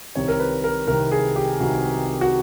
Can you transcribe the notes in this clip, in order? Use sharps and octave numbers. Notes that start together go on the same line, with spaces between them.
C2 C3 D#3 C#5
A#4
B4
A#4
C2 C3 D#3 A#4
G#4
G4
C2 C3 D#3 F#4
F#4